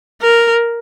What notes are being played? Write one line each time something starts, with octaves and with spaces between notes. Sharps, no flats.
A#4